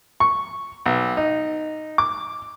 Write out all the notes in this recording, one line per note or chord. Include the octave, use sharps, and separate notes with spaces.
C#6
B1
D#4
D6